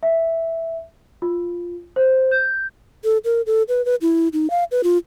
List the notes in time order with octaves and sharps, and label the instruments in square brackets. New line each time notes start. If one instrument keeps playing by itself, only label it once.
[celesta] E5
F4
C5
G6
[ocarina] A4
A#4
A4
B4
B4
E4
D#4
F5
B4
F4